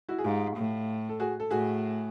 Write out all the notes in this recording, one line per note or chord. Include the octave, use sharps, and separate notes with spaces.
E4 F#4
G#4
G#2 F4 G4
A2
A4
F#4 G#4
A4
A2 F#4 G#4